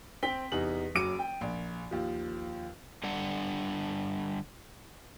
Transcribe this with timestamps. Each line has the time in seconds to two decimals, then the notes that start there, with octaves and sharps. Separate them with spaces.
0.23 C4 G5 B6 G7
0.52 E2 C3 D#4 F#7
0.95 F#1 F#3 D6 D7 D#7
1.19 G5
1.41 A#1
1.91 D#2 F3
3.04 D3 G3 D4 F#5